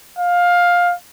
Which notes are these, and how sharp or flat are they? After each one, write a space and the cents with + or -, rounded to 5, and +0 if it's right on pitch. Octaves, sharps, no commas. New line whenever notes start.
F5 +15